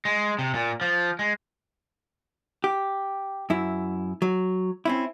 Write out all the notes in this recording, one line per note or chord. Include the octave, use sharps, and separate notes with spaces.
G#3
C3
A#2
F3
G#3
G4
F#2 E4
F#3
C4 C#4 E4